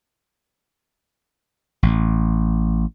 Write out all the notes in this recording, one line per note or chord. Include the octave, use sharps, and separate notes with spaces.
A1